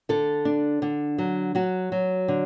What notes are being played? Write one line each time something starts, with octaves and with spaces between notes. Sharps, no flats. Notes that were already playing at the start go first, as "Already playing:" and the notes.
D3 A4
D4
D3
F#3
F#3 F#4
F#3
D3